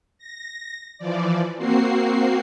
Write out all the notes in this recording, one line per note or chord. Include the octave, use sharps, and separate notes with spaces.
A#6
E3 F3 D5
A#3 C4 F#4 C7